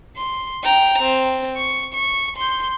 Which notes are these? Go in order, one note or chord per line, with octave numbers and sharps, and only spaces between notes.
C6
G5 A#5
C4
C#6
C#6
C6 G6